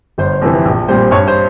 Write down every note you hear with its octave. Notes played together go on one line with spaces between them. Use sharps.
G1 C5
F2 C3 E3
A#1
A#2 G3 C4 C5
G2 C#5
C5